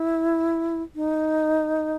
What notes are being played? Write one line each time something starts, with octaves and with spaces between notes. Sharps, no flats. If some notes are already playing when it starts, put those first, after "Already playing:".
Already playing: E4
D#4